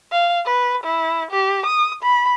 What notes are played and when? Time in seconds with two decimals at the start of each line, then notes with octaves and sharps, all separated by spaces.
0.12 F5
0.45 B4
0.83 E4
1.31 G4
1.66 D#6
2.03 B5